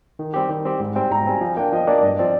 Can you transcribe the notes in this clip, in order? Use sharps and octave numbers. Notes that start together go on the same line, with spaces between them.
D#3
G3 C4 G4
D#3
G3 C4 G4
G#2
G3 C4 G5
G#2 A#5
G3 C4 G#5
F3 G#5
A#3 D4 G5
F3 D#5
A#3 D4 D5
G2 D#5
F3 C4 D5